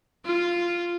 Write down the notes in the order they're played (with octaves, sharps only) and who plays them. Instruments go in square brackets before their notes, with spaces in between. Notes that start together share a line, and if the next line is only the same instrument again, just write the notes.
[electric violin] F4